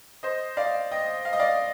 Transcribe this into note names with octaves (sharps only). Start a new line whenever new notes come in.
C5 D#5
D5 F5
D#5 G5
F5
D#5
D5 F5